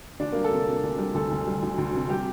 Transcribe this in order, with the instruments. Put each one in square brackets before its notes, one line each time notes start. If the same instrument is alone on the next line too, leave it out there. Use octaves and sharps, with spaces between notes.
[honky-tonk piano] D2 [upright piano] D4
[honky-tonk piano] G3 [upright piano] A#3
[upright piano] A4
[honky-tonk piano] C3
C3
D2
G3
[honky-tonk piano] D2 [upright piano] A4
[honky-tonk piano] D2
G3
D2
D2
C3
[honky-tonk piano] G3 [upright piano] G4